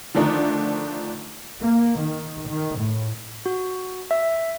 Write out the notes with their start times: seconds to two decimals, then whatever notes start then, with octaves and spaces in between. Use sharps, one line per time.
0.15 D3 D#3 F3 A3 D4 D#4
1.61 A#3
1.98 D#3
2.48 D#3
2.79 A2
3.46 F#4
4.11 E5